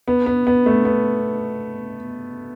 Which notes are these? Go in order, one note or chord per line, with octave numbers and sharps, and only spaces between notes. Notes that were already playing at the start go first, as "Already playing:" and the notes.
B3
B3
B3
A3
B3